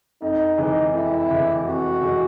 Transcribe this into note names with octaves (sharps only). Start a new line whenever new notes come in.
F2 D#4
C3 E3 G#3
F2 E4
C3 E3 G#3
F2 F#4
C3 E3 G#3